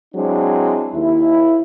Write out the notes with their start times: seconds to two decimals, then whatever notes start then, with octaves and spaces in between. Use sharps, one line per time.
0.15 F#3 G#3 C4 D4 E4
0.94 D#2 E4